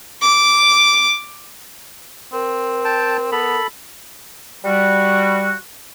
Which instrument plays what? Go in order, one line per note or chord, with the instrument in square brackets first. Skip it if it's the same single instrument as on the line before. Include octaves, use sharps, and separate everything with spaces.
[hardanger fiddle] D6
[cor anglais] C4 [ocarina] A#4
[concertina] G5 A5
[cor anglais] B3 [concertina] A4 B5
[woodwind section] G3 F#4